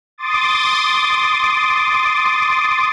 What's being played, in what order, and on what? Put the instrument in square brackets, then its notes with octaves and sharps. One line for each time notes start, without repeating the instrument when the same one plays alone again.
[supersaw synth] C6 D6 D#6 A6